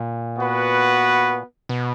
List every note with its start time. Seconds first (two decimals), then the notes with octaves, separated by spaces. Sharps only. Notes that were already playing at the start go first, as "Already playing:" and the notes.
Already playing: A#2
0.37 B3 F#4 B4
1.69 B2